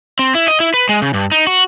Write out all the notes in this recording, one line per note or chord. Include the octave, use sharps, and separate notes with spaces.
C4
E4
D#5
E4
B4
G#3
C#3
G2
D#4
F#4